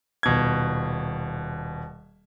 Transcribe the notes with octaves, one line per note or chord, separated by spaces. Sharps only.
D#1 B2 G#6